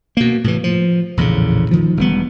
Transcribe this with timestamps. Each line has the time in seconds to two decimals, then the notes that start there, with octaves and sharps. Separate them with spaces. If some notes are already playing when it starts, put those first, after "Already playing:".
0.17 B2 A#3
0.44 A2 C3 E3
0.64 F3
1.17 A#1 E2 A2 C#3
1.71 D#3 F3
1.97 E1 G3 A#3 B3